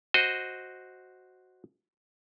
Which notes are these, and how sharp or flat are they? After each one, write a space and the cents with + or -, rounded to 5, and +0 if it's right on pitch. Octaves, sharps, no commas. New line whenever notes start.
F#4 +0 C5 +0 D#5 +0